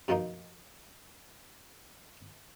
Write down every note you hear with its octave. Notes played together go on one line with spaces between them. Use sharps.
F#2 B2 F3 A#3 D#4